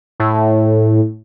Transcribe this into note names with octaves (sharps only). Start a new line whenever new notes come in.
A2